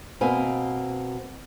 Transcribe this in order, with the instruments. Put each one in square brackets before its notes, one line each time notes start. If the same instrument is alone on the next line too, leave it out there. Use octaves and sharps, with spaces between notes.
[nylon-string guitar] B2 A#3 C4 B4 F5 G#5